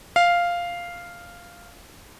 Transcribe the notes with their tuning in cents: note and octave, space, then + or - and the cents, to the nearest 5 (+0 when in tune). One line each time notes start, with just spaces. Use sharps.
F5 -5